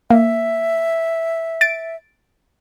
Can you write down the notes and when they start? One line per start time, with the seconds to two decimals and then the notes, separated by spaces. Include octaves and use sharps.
0.10 A#3 E5
1.61 A6 D7